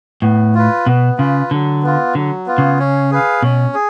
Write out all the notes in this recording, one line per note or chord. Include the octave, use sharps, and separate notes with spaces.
A2 B3
F4 B4
B2 B3
C#3 F4 B4
D3 F#3
B3 F4
D3 F#3
B3 F4
C#3
C#4
G#4 B4 F5
B2 C#4
G#4